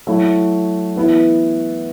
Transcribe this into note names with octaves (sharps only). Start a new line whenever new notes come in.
F#3 A3 E4
E3 B3 E4